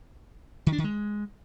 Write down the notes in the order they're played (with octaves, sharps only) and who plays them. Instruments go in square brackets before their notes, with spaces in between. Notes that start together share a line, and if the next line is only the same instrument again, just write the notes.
[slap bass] D#3
D4
D#3
G#3